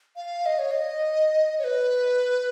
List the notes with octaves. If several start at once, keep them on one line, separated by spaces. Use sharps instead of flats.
F5
D#5
C#5
D#5
C#5
B4